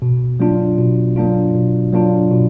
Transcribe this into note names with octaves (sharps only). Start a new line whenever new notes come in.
B2
F#3 A#3 D4 F4
B2
F#3 A#3 D4 F4
B2
F#3 A#3 D4 F4
B2